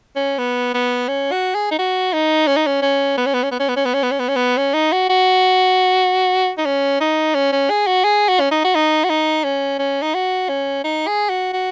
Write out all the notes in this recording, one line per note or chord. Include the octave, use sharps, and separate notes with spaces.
C#4
B3
B3
C#4
F#4
G#4
D#4
F#4
D#4
C#4
D#4
C#4
C#4
B3
C#4
B3
C#4
B3
C#4
B3
C#4
B3
C#4
B3
C#4
B3
C#4
B3
C#4
D#4
F#4
F#4
D#4
C#4
D#4
C#4
C#4
G#4
F#4
G#4
F#4
C#4
D#4
F#4
D#4
F#4
D#4
C#4
C#4
D#4
F#4
C#4
D#4
G#4
F#4
F#4